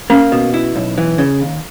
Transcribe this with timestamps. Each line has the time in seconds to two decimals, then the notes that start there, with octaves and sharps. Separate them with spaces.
0.10 A#3 C#4
0.32 B2
0.54 E4
0.76 B1
0.98 E3
1.18 C#3
1.41 D#2